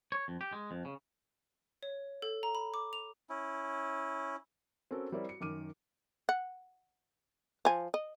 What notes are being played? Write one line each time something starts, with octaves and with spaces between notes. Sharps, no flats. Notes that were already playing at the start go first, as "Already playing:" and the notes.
C#5
F2
G4
G#3
F2
C#3
C#5
A4
A#5
B5
D6
F7
C#4 E4
C4 C#4 F#4 A4 A#4
G3 C4 E4 A#4 C#5 D5
F#4 C#7
F#2 D#3 D6 F6 D#7
F#5
F3 G#5
D#5